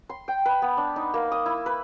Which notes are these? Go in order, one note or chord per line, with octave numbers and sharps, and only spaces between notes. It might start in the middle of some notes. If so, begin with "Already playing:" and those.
C6
G5
B4
B3
D4
D#4
A#3
D#6
E4
B4